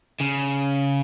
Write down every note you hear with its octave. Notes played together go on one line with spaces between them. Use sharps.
C#3